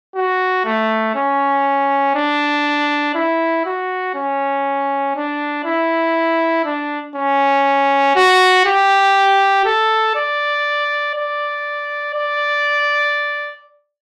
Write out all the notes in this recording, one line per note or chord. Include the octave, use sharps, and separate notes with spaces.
F#4
A3
C#4
D4
E4
F#4
C#4
D4
E4
D4
C#4
F#4
G4
A4
D5
D5
D5